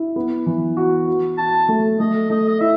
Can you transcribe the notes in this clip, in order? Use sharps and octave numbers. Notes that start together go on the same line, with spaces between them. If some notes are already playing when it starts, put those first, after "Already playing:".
Already playing: E4
B3
E3
F#4
F#4
F#4 A5
A3
A3 D#5
A3 D#5
D#5
E4 E5